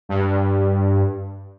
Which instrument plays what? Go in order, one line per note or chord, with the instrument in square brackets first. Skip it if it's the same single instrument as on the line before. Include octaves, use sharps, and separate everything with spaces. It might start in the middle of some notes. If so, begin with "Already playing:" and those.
[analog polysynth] G2